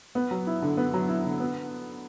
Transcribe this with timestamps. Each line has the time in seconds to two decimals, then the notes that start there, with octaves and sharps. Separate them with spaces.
0.15 B3
0.31 F#3
0.47 E4
0.62 D3
0.77 B3
0.94 F#3
1.08 E4
1.24 D3
1.40 B3